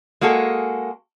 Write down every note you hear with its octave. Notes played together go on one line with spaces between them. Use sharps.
G#3 A#3 F#4 G#4 A4